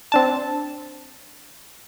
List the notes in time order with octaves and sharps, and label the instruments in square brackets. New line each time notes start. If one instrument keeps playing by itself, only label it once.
[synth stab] C4 D4 A5